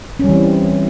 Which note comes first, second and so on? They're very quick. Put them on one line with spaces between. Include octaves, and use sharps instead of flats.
C#4 G3 E3 C4